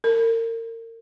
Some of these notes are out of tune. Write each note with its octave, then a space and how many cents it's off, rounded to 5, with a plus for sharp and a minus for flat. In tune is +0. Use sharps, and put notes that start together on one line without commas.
A#4 -35